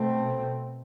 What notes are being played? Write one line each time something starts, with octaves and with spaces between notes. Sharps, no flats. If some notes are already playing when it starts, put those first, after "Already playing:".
Already playing: B2 A3 C4